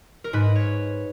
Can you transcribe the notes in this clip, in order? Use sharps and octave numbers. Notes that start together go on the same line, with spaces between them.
A#4
G#2 B4
C#5